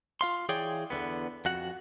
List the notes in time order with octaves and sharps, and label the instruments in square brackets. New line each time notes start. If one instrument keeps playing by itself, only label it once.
[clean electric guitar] F4 F5 C6
E3 G#4 C#5 D5 F5 G5
E2 G2 D3 B3
F2 F#4 F#5